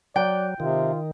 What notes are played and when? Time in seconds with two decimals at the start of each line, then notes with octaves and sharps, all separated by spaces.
0.16 F#3 D5 G5
0.60 C3 D#3 F4